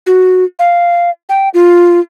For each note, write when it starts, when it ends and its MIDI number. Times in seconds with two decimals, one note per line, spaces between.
0.07 0.44 66
0.59 1.10 77
1.29 1.49 79
1.54 2.00 65